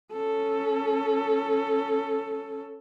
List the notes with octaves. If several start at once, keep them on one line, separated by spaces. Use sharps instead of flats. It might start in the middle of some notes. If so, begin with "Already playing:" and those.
C#4 A4